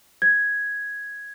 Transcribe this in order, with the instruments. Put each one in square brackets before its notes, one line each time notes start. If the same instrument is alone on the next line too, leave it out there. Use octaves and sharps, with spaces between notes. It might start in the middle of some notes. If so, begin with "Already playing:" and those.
[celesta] G#6